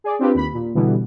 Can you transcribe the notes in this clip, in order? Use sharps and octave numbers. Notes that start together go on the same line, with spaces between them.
G#4 D5
C4 D4 F4 G4 B4
D#2 B5
A#2
B2 D3 E3 G3 B3